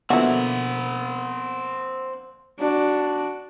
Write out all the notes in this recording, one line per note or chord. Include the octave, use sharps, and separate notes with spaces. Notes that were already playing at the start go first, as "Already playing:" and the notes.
B2 D3 F3 A#3 C4 E4 F#4 F#5
D4 F#4